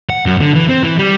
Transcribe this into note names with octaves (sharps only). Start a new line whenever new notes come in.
F#5
F#2
D3
E3
C4
E3
G3